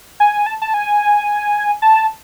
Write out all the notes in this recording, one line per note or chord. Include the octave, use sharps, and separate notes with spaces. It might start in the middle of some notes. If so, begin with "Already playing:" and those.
G#5
A5
A5
G#5
A5